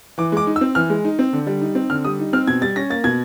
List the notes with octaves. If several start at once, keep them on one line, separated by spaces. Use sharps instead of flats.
E3 D6
G#3 D6
D#4
E6
C4
E3 F6
G#3
D#4
C4
D3
G3
D#4
C4
D3 F6
G3 D#6
D#4
C4 F6
B2 G#6
G3 A6
C#4 A#6
A#3 A6
B2 G#6